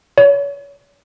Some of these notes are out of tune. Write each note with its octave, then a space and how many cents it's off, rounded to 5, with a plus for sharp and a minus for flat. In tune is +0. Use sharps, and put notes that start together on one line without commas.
C#5 +30